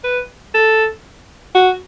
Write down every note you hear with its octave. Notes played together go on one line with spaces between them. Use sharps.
B4
A4
F#4